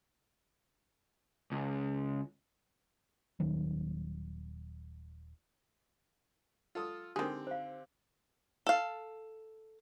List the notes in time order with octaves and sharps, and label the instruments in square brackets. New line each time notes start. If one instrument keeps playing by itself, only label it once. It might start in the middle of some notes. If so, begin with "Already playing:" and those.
[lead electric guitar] C#2
[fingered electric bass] D#1 D#3 F#3
[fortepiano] F4 A4 D#6
[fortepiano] D3 C4 [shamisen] D#3 G#4 [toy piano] G4
[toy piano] C5 F5
[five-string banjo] A4 F5